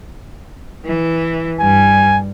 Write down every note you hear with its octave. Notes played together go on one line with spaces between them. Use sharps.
E3
G2 G3 G#5